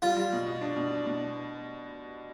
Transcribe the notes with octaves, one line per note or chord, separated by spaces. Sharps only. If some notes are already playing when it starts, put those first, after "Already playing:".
G3 F4
G3
B2
B2
D4
B2
D4
B2